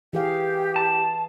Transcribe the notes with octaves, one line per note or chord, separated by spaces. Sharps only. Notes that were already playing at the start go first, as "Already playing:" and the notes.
E3 G4 G#4 F5
A5